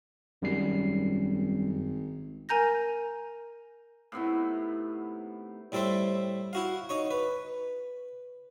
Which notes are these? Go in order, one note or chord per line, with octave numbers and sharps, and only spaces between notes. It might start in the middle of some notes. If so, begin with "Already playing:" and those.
G#1 F#2 G3 C7
A#4 G#5 A#5 G6 A#6
A2 C3 B3 D#4
A2 G3 A4 C5 E5
E4 F#4 F5
D#4 C#5 C#6
B4